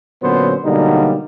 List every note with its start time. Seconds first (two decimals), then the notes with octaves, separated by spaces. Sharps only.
0.22 A#2 D3 F#3 B3 C#4 C5
0.64 B2 D3 F#3 G3 A#3 D#4